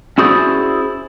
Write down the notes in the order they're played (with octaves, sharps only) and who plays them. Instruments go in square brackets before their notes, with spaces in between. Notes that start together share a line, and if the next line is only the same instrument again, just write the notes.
[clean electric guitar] C#4 E4 F#4 G#4 C5 D5